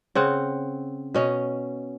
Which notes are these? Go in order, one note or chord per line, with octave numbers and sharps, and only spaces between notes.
C#3 C4 F#5
B2 C#4 D#5